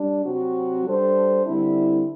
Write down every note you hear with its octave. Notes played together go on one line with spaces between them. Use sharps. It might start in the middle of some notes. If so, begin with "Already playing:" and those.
Already playing: G3 D4
C3 F#3 C4 F#4
G3 D4 A4 C5
D3 G3 C4 E4